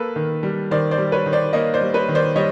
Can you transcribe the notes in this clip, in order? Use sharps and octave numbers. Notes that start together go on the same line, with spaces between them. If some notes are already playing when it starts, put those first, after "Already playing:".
Already playing: A#3 A4 B4
D#3
G3
D#3 C5 D5
C5 D5
G3
B4 C#5
D#3
C5 D5
A#3 C#5 D#5
C5 D5
G3
B4 C#5
D#3
C5 D5
G3 C#5 D#5